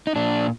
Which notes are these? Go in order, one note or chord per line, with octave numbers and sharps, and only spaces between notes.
D#4
A#2 D4